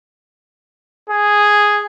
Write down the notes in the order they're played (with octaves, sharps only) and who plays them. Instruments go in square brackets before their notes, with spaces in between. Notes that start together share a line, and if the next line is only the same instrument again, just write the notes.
[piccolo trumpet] G#4